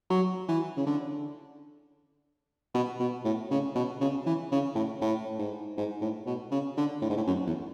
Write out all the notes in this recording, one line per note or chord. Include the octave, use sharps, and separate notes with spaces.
F#3
E3
C#3
D3
B2
B2
A2
C#3
B2
C#3
E3
C#3
A2
A2
G#2
G#2
A2
B2
C#3
D3
A2
G#2
A2
F#2
E2